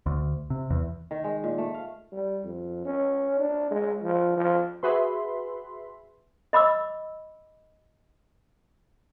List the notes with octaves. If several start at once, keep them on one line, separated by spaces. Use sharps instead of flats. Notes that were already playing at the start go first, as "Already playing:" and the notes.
D2
C3
E2
D#3
G#3
A#2
A3
F5
G3
F2
C#4
D4
G#3
F3
F3
F#4 G#4 B4 E5 B5 C6
D#5 B5 D6 E6